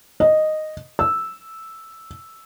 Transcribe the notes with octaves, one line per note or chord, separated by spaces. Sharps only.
D#5
E6